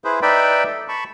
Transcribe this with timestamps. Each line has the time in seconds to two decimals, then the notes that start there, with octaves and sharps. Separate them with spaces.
0.04 E4 G#4 B4 C5
0.22 D#4 B4 D5 E5 G5 B5
0.67 A4
0.88 A5 B5 C#6